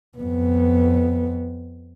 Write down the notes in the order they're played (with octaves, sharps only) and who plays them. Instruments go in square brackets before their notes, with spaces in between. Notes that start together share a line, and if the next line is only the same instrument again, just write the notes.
[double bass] F2 B3